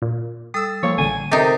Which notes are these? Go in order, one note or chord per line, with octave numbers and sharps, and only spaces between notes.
A#2
G3 A4 D#6 E6
F3 A#3 C#5
A1 D3 G#5 D#7
C3 D#4 G4 A4 A#4 C5